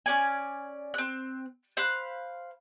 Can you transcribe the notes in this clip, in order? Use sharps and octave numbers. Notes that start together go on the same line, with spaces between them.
C#4 D5 G#5
C4 F#6
C5 F5 B5 F#6